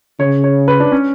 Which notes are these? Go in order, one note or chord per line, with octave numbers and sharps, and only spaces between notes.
C#3 C#5
C#5
B4
D4
C#4